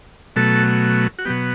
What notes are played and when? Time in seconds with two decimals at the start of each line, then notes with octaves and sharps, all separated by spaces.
0.36 B2 F#3 A3 A4
1.19 F#4
1.25 B2 F#3 B3 G4